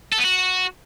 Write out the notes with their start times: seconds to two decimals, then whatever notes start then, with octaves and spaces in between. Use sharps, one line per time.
0.12 A4
0.18 B3
0.24 F#4